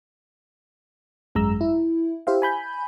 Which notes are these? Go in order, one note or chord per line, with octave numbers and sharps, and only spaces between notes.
G#1 F#2 G#3 A#5 E6
E4
E4 G4 C5 E5 F5
G#5 B5 G6